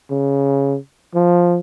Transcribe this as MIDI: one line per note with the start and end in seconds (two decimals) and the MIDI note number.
0.11 0.77 49
1.15 1.60 53